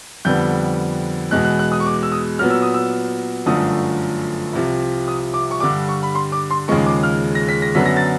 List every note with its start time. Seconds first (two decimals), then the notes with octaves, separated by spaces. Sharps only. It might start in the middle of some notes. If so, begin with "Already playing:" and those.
0.25 F2 D3 G3 B3 G6
1.31 E2 B2 G#3 F#6
1.45 F#6
1.59 F#6
1.72 D#6
1.80 C#6
1.86 D6
2.03 E6
2.12 D#6
2.39 A#2 F#3 B3 F6
2.50 E6
2.62 D#6
2.74 E6
3.46 G1 F#2 D3 F3 A3 D#6
4.53 C2 C3 F3
5.08 D#6
5.34 D6
5.51 C#6
5.60 G2 D3 G3 D6
5.88 C#6
6.03 B5
6.15 C6
6.32 D6
6.51 C6
6.68 D#2 C#3 F3 G#3 C#6
6.86 D6
7.03 F6
7.35 A#6
7.49 B6
7.62 A#6
7.75 F#2 D3 F#3 B3 B6
7.86 A#6
7.97 A6